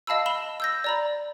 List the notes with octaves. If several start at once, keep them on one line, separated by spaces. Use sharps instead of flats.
D#5 F5 A5 B5 E6
B5 E7 G7
E6 G6 A#6
D5 A#5 B5